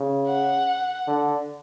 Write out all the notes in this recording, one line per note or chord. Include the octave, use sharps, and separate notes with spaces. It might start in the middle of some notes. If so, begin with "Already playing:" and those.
Already playing: C#3
F#5
D3